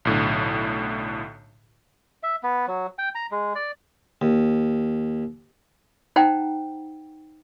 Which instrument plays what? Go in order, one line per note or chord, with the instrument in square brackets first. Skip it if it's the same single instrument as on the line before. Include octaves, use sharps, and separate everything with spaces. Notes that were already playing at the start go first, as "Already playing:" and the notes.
[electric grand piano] B1 A2 D3
[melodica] E5
B3
F#3
G5
A#5
G#3
D5
[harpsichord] D#2
[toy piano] D#4 C5 F#5 G5 A#5